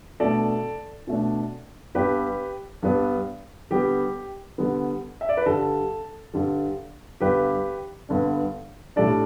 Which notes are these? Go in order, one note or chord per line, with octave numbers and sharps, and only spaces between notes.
B2 A3 D4 A4 D5
B2 A3 D4
G2 G3 B3 D4 G4 B4
G2 G3 B3 D4
D3 G3 B3 G4
D3 G3 B3
E5
D5
B4
G2 D3 G3 A4
G2 D3 G3
G2 D3 B3 D4 G4 B4
G2 D3 B3 D4
A2 G3 D4 A4 D5